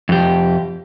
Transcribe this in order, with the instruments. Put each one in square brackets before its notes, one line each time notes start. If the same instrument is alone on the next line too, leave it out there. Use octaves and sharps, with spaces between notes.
[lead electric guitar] F2 G4